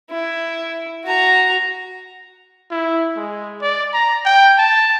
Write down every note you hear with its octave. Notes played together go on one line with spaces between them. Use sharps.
E4
F#4 A#5
E4
G#3
D5
A#5
G5
A5